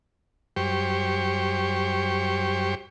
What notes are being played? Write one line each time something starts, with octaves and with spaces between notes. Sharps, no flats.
F#2 G3 G4 C5 C#6